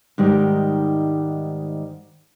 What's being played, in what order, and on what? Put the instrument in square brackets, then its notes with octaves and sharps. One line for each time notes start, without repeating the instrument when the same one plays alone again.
[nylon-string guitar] G#2 D#3 G3